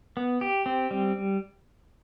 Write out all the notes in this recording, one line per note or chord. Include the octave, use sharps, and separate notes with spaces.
B3
G4
C4
G3